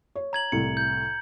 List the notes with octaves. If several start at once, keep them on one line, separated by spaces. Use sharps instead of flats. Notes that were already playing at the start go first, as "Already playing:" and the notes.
C#5
A#5 G#6 F#7
C2 A2 C#7
G6